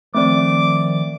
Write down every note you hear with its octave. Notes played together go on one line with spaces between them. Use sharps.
D#3 F3 A3 C4 D5 D6